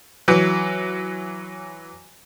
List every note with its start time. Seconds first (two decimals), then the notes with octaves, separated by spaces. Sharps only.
0.28 E3 F#3